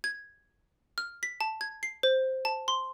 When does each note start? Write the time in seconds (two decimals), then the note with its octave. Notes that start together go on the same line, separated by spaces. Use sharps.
0.04 G#6
0.98 F6
1.23 B6
1.41 A5
1.61 G#6
1.83 C7
2.03 C5
2.45 A5
2.68 C6